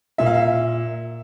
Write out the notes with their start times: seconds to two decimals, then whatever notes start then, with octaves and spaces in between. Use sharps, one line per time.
0.18 A#2 E5
0.26 F5
0.34 E5